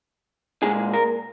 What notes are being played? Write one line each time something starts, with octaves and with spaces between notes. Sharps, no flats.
A#2 G#3 G#4
A#4